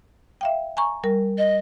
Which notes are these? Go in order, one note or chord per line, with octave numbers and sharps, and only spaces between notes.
E5 F5 G5
G#5 A#5 C#6
G3 A#4
D#5